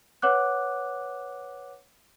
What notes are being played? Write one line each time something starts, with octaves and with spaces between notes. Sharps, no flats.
B4 C#5 F#5 D6 F#6